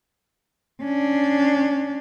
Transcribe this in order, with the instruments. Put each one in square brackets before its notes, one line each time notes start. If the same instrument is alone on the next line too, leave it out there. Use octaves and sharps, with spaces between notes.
[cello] C#4 D4